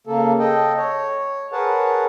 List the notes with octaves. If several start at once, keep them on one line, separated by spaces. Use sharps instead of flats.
C#3 A#3 A4
A4 D#5 G5
C#5
G#4 A#4 B4 C#5 F#5 A5